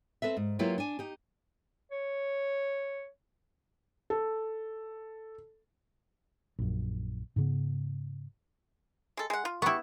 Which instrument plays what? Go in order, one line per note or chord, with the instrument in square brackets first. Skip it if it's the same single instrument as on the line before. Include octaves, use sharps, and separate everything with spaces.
[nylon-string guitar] C4 A4 B4 E5
G#2
F#3 A#3 E4 F4 G4 B4
D4 G#5
D#4 G4
[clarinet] C#5
[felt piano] A4
[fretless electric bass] A#1 F#2
G#2 C#3 B3
[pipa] G#3 A4
G#3 F#5
F4
[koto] B3 E4 [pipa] G4 C#6